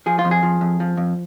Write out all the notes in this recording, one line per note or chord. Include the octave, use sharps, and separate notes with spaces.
F3 G#4
F4
F2
G#4
F3
F2
F3
F2